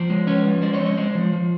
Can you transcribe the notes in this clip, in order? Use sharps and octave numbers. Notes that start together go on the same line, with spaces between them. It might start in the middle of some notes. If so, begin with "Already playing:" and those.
Already playing: F3 C5 D5
G#3
C#4 B4 C#5
F3
G#3 C5 D5
C#5 D#5
C4
C#5 D#5
G#3 C5 D5
F3
F3